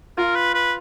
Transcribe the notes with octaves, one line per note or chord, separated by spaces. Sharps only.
F4 A#4
B4
B4